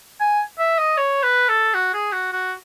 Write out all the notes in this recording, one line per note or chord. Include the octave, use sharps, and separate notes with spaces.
G#5
E5
D#5
C#5
B4
A4
F#4
G#4
F#4
F#4